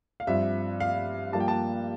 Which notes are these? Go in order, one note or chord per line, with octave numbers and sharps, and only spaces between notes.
F5
G2 F3 C4 E5
F5
G2 F3 A#3 A5
G5
A5